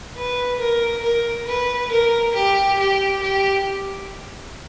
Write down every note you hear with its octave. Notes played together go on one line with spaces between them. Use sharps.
B4
A#4
A#4
B4
A#4
G4
G4
G4